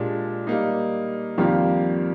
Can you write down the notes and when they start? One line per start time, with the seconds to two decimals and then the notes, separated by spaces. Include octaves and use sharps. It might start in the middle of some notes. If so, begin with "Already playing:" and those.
Already playing: A#2 G#3 D4 G4
0.47 G3 A#3 D#4
1.38 F2 D#3 G3 A#3 F4